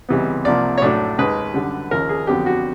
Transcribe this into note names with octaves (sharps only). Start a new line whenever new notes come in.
C#2 C3 E3 G3 B3
C2 C3 F3 A#3 D5
C#5
A2 F#3 A3 D4 D5
D#2 D#3 G#3 B4
F#2 D3 G3
D#2 C#3 F3 A#4
G#4
F2 D3 F#3 B3 D4 G4
F#4